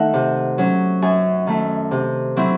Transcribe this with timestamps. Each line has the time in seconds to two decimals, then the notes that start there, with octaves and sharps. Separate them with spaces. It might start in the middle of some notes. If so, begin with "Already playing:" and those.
Already playing: D#3 A3 D#4 E5 F#5
0.14 C3
0.58 F#3 C#4
1.02 F#2 G#5
1.47 D#3 A3
1.91 C3
2.36 F#3 C4 E4